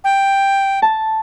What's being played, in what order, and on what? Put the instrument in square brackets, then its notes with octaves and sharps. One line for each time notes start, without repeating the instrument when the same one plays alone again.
[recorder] G5
[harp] A5